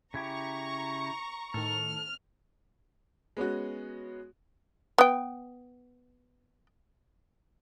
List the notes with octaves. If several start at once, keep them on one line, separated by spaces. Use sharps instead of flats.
C#3 E4 G4 A#5 C#6
A2 D#3 A4 F6
G#3 B3 C#4 F#4
B3 G5